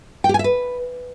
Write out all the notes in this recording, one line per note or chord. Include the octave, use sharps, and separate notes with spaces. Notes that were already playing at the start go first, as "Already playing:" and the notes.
G5
G4
G#5
E5
B4